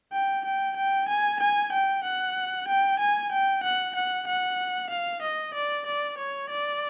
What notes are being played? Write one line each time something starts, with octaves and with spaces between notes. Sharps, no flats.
G5
G5
G5
G#5
G#5
G5
F#5
G5
G#5
G5
F#5
F#5
F#5
F5
D#5
D5
D5
C#5
D5